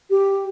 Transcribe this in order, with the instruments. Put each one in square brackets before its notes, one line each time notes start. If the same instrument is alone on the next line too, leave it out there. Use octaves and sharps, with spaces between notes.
[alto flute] G4